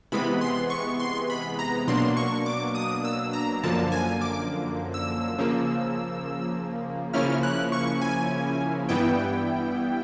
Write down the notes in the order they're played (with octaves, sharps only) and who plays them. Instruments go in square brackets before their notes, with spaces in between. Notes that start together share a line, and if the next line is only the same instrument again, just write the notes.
[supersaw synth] C3 E3 G#3 B3 B5
C6
C#6
C6
B5
A#5
B2 F#3 A#3 D4 C6
C#6
D6
D#6
E6
A#5
F#2 D3 F3 A#3 A5
G#5
D6
E6
C#3 F3 A#3
C#3 F3 A#3 C#4 E4 F6
F#6
C#6
G#5
G2 E3 G3 B3 E4 G5